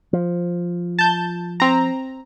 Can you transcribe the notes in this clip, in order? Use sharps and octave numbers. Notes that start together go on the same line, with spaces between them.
F3
A5 G6
C4 A#5